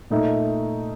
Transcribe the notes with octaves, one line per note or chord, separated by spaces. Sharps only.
A#2 A3 D#4